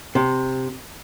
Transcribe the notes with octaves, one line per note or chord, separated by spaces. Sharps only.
C3